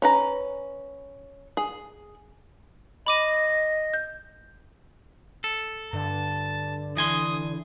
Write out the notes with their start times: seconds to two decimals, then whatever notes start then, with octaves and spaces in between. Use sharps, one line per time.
0.02 C#4 B4 A#5
1.57 G#4
3.06 D#5 B5 D6 D#7
3.94 G6
5.44 A4
5.93 G2 D3 A5
6.97 E3 G#5 C6 D#6